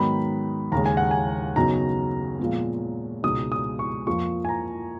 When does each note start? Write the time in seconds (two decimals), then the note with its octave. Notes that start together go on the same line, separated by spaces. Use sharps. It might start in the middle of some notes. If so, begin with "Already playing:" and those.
Already playing: G#2 D#3 F#3 B3 D#4 B5
0.72 D#2 C#3 G#3 A#5
0.86 G#5
0.97 F#5
1.11 G#5
1.56 F#2 C#3 F#3 B3 D#4 A#5
2.39 A#2 F3 G#3 B3
3.23 C#2 B2 G#3 D#4 D#6
3.52 D#6
3.79 C#6
4.07 F2 F3 A#3 C#6
4.45 G#5
4.49 A#5